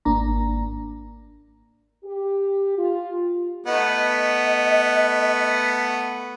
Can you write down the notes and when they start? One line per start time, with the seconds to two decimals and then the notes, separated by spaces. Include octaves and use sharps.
0.05 G#1 A#3 D4 A#5
2.04 G4
2.78 F4
3.66 A3 B3 D#5